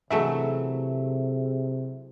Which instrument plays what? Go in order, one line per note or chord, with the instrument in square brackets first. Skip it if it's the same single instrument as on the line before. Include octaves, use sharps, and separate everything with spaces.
[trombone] C3 [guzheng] E3 F#3 A3 [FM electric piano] G#4 E5